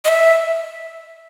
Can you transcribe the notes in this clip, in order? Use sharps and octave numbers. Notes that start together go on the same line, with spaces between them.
D#5
E5